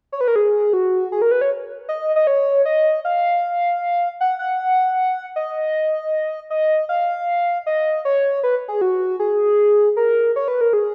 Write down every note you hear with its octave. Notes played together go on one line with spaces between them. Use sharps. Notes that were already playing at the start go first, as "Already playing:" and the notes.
C#5
B4
A#4
G#4
F#4
G#4
A#4
B4
C#5
D#5
D#5
C#5
D#5
F5
F#5
F#5
D#5
D#5
F5
D#5
C#5
B4
G#4
F#4
G#4
A#4
C#5
B4
A#4
G#4